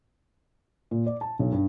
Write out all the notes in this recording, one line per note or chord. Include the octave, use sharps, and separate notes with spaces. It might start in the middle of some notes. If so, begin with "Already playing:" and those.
A#2
D5
A5
B1
G2